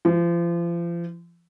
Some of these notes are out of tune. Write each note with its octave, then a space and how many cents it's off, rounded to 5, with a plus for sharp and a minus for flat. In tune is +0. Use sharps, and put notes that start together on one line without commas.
F3 -35